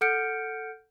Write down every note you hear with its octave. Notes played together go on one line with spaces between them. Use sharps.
A4 F#5 F6 G6 C#7 D7